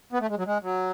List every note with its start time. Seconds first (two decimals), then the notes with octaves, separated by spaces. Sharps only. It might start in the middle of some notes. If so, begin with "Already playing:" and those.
0.13 B3
0.21 A3
0.29 G#3
0.38 F#3
0.46 G#3
0.63 F#3